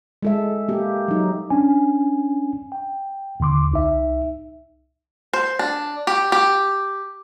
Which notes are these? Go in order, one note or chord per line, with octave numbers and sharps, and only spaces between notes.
G#3 A4 E5
A#3 G4
F#3 D#4
C#4 D4 G#5
G5
D#2 D3 C6 D6
C2 D#4 E5
C5
D4
G4
G4